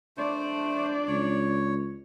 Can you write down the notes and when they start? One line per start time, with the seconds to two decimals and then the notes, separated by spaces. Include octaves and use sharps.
0.17 A3 D4 C5 D5
1.08 C#2 C#5